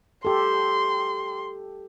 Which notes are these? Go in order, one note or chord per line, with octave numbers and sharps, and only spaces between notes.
G4 A4 C6